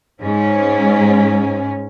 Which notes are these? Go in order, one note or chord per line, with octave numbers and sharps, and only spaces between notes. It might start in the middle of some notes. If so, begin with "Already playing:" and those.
G#2 C#4